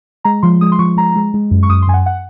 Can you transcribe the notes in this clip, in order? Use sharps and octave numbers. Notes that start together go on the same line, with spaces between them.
G#3 A#5
F3 C6
G#3 D#6
C6
F3 C#6
G#3 A#5
G#3
G#3
F#2
C#6
F#2 D#6
C6
F#2 G#5
F#5
F#5